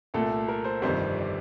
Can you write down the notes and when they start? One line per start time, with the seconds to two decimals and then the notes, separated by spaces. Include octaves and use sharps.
0.14 C2 A#2 A3 A4
0.48 A#4
0.64 C5
0.82 G1 F2 C3 D#3 G3 C5
1.16 D5